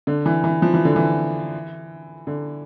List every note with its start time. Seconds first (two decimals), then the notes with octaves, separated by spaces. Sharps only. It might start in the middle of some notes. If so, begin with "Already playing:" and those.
0.07 D3
0.26 E3
0.44 E3
0.62 F3
0.74 E3
0.85 D3
0.96 E3
2.27 D3